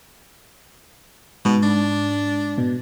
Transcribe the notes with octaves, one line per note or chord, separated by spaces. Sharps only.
G#2 B2
D4
B2